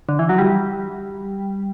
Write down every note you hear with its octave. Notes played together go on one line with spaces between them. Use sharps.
D3
E3
F#3
G3